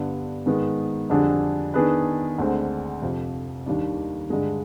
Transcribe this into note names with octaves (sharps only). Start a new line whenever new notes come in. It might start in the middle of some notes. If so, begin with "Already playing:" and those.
Already playing: G2 D3 G3 B3
G#2 D#3 G#3 B3
F2 D3 G3 D4 G#4
D#3 B3 D4 G#4 B4
D2 D3 G#3 C4
F2 C3 F3
D#2 D#3 G3 D4
G2 D3 G#3